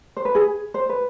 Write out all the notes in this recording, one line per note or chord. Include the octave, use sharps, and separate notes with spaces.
C5
B4
G#4
C5
B4